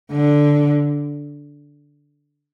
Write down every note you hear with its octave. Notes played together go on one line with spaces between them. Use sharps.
D3